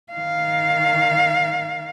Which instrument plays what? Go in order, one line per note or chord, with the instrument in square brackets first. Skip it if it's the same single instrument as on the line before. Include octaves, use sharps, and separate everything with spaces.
[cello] D#3 F5